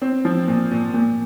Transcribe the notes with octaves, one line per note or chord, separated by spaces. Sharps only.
C4
F3
A#2
A#2
A#2